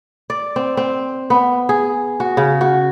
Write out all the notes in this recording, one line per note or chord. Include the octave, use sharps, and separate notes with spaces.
D5
C4
C4
B3
G#4
F#4
C#3
F#4